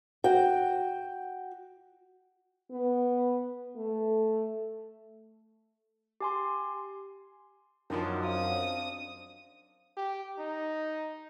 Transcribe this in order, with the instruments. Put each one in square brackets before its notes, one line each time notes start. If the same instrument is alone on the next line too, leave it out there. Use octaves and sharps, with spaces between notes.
[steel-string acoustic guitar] F#4 G5
[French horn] B3
A3
[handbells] G4 G#5 C6
[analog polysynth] F#2 [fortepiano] D#3 F3 [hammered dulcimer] D4 D#5 C6
[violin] C4 D#6 [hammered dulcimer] F5
[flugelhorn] G4
D#4